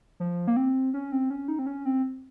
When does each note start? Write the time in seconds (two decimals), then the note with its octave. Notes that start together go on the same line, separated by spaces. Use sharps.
0.20 F3
0.48 A#3
0.57 C4
0.94 C#4
1.12 C4
1.30 C#4
1.48 D#4
1.59 C4
1.66 C#4
1.85 C4